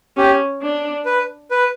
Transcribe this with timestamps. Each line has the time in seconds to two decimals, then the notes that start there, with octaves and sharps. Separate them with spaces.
0.17 C#4 G4
0.62 D4
1.05 B4
1.51 B4